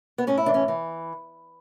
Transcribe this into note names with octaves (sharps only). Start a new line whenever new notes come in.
B3
A2 C#4
E4
E3 D4
C#4
E3